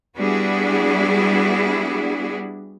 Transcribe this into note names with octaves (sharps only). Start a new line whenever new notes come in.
G3 B3 D4 E4 F#4 G#4